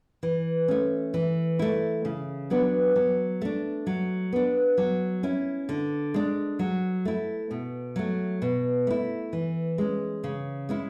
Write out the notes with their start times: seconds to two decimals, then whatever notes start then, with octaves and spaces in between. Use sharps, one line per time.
0.23 E3
0.68 A3 C#4
1.14 E3
1.59 A3 E4
2.05 C#3
2.50 F#3 B3 D4
2.96 F#3
3.41 A3 D4
3.87 F#3
4.32 B3 D4
4.78 F#3
5.23 C#4 E4
5.69 D3
6.14 G#3 D4
6.59 F#3
7.05 A3 E4
7.51 B2
7.96 F#3 A3
8.42 B2
8.87 A3 E4
9.33 E3
9.78 G#3 C#4
10.24 C#3
10.69 G#3 C#4 E4